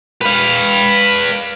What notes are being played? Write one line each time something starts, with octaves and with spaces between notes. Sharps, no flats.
B4 F5